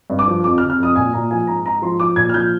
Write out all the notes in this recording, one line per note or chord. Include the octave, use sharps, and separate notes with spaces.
G2
D6
F3
F2 D6
F6
C3
F6
F2 D#6
A#2 G#5
A#2 A#5
F3 G#5
G#2 A#5
G#2 A#5
F3 C6
F3 D6
A#2 G#6
F6
F3 G6